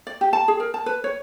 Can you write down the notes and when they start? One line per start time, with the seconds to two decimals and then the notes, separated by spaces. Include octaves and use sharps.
0.07 D5
0.21 G4
0.33 A5
0.48 G#4
0.60 A#4
0.74 A5
0.86 B4
1.04 C#5